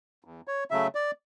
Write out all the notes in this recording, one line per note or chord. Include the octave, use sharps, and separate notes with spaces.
E2
C#5
C#3 F#3 A3 E5
D5